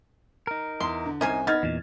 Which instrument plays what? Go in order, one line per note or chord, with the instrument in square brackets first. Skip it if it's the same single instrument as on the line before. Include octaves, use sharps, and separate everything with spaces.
[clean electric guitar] D#4 A#4
[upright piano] E2 [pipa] C6
[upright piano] D3
[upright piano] C2 [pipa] C#4 C5 G#5 [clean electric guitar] D#4
[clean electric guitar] B3 [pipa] D#4 [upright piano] F6 G#6 A6
[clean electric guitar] E2 A#2